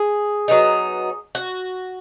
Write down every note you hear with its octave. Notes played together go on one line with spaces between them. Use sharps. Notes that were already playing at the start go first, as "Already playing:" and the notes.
Already playing: G#4
F#3 B3 D#4
F#4